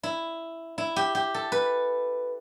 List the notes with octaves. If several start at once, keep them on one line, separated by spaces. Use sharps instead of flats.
E4
E4
G4
G4
A4
B4